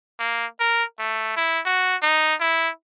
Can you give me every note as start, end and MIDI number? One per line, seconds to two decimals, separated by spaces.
0.19 0.46 58
0.60 0.84 70
0.99 1.35 57
1.37 1.60 64
1.66 1.96 66
2.02 2.34 63
2.40 2.69 64